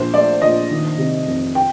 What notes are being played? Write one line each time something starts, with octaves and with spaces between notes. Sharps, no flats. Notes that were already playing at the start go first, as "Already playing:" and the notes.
Already playing: A#1 C5
A3 D5
A#1 D#5
D#3
C3
F1
G5